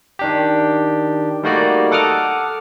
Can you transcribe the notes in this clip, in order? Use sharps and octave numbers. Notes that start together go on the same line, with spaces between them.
D#3 D4 G4
G3 A3 A#3 D#4 F#4 D5
A4 F#5 D6 D#6 F6